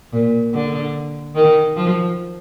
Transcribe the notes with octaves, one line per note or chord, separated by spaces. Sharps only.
A#2
D3
D#3
F3